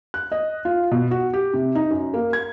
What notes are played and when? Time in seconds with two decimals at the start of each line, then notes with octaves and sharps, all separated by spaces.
0.14 F#6
0.32 D#5
0.65 F4
0.91 B2
1.11 F#4
1.34 G4
1.54 C3
1.75 D#4
1.90 F#2
2.14 A#3
2.33 G#6